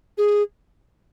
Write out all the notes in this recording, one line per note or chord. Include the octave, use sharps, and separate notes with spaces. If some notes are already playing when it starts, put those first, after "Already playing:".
G#4